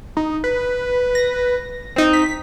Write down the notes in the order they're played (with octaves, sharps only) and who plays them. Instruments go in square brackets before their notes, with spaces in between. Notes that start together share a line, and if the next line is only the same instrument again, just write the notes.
[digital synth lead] D#4
B4
[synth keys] A#6
C4 D#4
[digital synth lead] B6